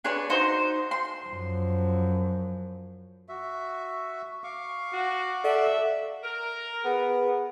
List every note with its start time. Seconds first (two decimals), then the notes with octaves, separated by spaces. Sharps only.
0.04 D4 G#4 B4 C#5
0.30 D#4 F#4 C5
0.91 C6
1.26 F#2 F3
3.29 F#4 E5
4.44 F5 C#6 D6
4.93 F#4
5.44 A4 D5 E5 F#5
6.24 A#4
6.85 B3 G#4